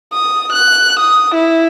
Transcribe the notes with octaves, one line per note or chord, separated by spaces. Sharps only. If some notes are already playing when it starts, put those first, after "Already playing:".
D#6
F#6
D#6
E4